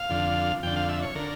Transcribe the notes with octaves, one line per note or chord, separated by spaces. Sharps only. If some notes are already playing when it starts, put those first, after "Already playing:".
Already playing: F5
F2 D3
F2 D3 G5
F5
E5
C#5
D3 A#4